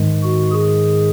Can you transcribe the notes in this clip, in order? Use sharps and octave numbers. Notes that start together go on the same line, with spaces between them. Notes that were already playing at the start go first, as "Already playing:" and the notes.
Already playing: G#2 D#3 G#3
F#4
G#4